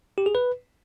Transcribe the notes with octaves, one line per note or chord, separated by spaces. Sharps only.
G4
G#4
B4